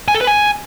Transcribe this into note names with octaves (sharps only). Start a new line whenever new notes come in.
G#5
A4
B4
G#5